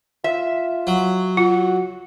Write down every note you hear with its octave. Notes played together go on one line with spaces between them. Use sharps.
F4 E5
F#3
F4 F#4